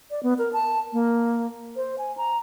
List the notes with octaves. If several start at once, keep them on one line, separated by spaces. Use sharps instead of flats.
D5
B3
A#4
A5
A#3
C5
G#5
A#5